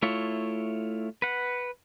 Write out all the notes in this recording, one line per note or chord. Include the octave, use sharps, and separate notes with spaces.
A3 E4 F4 C#5
B4 F#5